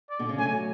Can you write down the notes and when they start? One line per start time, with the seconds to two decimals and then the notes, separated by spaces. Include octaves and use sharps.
0.10 D5
0.19 B2 D3
0.29 C#3
0.38 F#3 A3 G#5